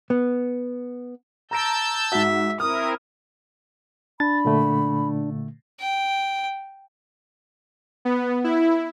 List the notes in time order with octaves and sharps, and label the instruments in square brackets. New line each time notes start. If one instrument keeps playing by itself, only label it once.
[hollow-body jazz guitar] B3
[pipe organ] A5 E6 G6 [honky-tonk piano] A#5 A#6 D7
[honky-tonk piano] G#2 F#4 [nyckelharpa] E5
[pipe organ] C4 E4 A#4 [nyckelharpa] D#6 [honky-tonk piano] F6
[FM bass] D4 [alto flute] B5 [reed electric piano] A6
[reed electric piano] A#2 D3 A3
[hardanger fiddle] G5
[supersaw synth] B3
E4